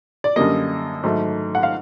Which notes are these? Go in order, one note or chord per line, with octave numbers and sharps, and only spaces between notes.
D5
F#2 D3 G3 A#3 D#5
G#2 D#3 F#3 A3
F#5
F5